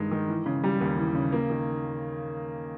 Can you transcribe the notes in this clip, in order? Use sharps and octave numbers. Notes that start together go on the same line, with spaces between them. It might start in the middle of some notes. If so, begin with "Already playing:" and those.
Already playing: G2 D#3 G#3 D#4
D#3
E3
C#3
G3
D#2
E3
C#3
A#3
D#3